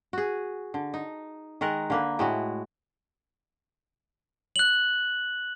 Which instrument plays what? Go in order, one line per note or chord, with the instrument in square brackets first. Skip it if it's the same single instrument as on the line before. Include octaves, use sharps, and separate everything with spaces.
[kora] F#4 G#4
D3
D#4
D#3 G#3 A#4 F#5
D3 A#3 B4
A2 G#3 E4 F#4
[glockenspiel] F#6 F#7